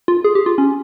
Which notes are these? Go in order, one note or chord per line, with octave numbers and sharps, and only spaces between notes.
F4
G#4
G4
F4
C#4